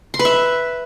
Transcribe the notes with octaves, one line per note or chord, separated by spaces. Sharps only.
C6
B4
E5